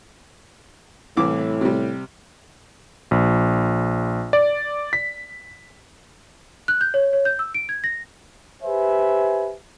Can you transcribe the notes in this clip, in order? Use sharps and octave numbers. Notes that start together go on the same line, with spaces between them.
C2 A2 E3 D6
C3 G3
A#1
D5
B6
F#6
G6
C#5
C#5
G6
E6
D7
G#6
A#6
G4 B4 C5 E5 G#5